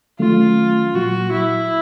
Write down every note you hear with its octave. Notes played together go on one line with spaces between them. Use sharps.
D#3 F#3 A3 C#4 F4
A#2 F#3 A#3 F#4
E4